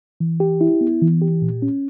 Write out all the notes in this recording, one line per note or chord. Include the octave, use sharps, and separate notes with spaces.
E3
G4
E4
B3
E3
G4
A#2
C#4